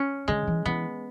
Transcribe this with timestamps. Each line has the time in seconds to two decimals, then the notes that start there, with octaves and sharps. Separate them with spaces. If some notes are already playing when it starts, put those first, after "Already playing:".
Already playing: C#4
0.28 D3 G#3
0.47 E3
0.66 E3 B3